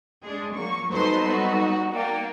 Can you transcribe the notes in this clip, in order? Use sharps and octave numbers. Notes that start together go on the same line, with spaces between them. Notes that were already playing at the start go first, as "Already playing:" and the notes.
G#3 D4 G#4
F3 F#3 A#3 C#6
F#3 G3 B3 D#4 A4 B4 C5 C6
F#4
A#3 D5 F#5 G5